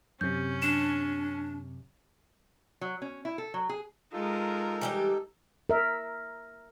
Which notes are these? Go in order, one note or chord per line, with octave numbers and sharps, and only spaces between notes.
F#2 C3 C#4 G6
D4 E7
F#3
C#4
E4
A4
F#3
G#4
G#3 D#4 F4 A4 A#4
E3 G3 G4
A#4 E5